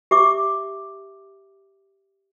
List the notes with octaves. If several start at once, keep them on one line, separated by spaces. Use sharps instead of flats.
G4 E5 D6